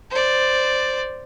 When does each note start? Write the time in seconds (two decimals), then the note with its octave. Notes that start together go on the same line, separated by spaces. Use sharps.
0.11 C5 D5